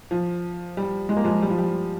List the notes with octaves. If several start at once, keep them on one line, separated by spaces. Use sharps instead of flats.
F3
G3
G#3
A#3
F3 G#3
G3
F3
G3